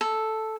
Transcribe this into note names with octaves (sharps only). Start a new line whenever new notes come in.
A4